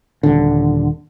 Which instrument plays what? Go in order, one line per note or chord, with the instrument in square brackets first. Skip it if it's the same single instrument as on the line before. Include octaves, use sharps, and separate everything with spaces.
[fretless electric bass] D#1 D3